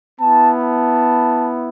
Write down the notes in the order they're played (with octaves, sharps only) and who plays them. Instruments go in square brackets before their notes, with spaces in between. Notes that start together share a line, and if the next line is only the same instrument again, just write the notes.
[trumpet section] B3 E4 A5
A5